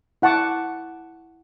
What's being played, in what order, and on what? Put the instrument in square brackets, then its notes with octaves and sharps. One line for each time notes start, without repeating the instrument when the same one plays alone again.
[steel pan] E4 F#5 A5 C#6 D6